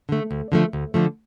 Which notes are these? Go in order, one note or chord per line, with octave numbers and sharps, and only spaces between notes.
D3 A3
D2
D3 F3 A3
D2
D3 F3 A3